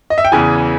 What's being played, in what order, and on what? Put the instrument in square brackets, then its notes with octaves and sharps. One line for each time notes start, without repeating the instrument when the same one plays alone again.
[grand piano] D#5
E5
G5
E2 C#3 E3 G#5